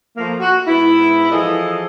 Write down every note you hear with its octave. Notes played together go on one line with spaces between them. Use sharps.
F3 A3 A#3
F#4
G#2 B3 E4
E3 F3 G#4 A4 D#5